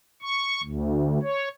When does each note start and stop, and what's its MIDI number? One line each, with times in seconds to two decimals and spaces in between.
0.22 0.62 85
0.63 1.19 38
1.22 1.49 73